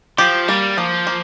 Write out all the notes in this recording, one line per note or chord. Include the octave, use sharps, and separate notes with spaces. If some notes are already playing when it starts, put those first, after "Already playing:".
F3 G4
G3 A#3
F3 A#3
A#3